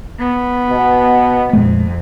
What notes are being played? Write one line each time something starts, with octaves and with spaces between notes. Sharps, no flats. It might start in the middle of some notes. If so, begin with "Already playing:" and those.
B3
B2
F2 A#2 G#3 A3